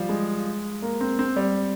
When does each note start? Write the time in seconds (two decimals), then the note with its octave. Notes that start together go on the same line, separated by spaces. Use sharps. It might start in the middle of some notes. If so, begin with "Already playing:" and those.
Already playing: F3 G3
0.09 G#3
0.82 A#3
1.01 C4
1.19 C4
1.36 G3